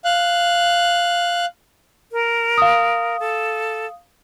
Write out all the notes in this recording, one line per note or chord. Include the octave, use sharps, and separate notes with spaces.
F5 F#6
A#4
F5 D#6
A4